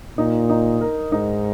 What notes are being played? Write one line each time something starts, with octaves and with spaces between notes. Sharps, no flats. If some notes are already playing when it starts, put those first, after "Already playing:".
A#2 D#4
D#4
A#4
G#2 D#4